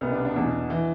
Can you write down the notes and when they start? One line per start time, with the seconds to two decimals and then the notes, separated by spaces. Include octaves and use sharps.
0.01 C2 B2 B3
0.12 D4
0.25 D4
0.36 E2 B2
0.70 E3